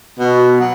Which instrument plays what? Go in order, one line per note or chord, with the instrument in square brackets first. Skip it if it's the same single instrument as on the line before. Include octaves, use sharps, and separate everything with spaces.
[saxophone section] B2
F#3